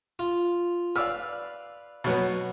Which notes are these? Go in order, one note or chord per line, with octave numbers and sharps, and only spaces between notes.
F4
B4 D5 F5 E6 F6
B2 F#3 B3